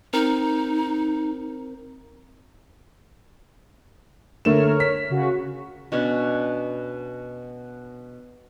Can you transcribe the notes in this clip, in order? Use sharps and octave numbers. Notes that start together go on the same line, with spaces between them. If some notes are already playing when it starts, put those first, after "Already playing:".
C4 D#4 A#4
D3 A3 A#4 C#5 F6 E7
B6
C#3 F#4
B2 C#4 D4